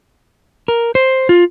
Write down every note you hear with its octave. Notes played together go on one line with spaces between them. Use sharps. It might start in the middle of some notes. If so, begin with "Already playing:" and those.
A#4
C5
F4